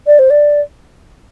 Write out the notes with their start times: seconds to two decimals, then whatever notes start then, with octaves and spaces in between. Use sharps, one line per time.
0.06 D5
0.19 C5
0.30 D5